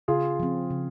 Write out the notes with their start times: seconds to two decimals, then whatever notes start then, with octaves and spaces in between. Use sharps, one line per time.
0.08 C#3 F4 G#4
0.40 F3 C4
0.70 C#3